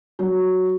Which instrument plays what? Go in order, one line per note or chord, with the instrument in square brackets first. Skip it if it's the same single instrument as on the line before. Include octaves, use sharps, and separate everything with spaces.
[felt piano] F#3